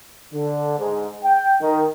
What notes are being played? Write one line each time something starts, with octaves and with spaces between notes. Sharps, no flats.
D3
G#2
G5
D#3